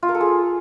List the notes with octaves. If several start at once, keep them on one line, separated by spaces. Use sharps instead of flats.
F4
A#4
A4
G#4